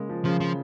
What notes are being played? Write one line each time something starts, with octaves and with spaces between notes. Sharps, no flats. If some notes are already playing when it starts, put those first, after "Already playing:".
Already playing: C#3 G#3 A#3
F3
C#3 F3
C#3 F3